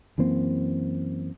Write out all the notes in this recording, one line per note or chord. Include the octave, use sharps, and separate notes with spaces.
F#2 E3 A#3 C4